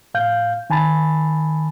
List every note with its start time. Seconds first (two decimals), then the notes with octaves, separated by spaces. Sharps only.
0.14 A2 F5 G6
0.70 D#3 G#5 A5 B5 A6